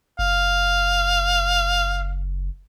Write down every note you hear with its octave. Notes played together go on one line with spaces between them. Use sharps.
F#1 F5